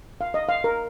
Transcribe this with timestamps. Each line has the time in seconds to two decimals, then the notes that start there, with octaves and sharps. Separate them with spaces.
0.21 F5
0.34 D#5
0.48 F5
0.64 A#4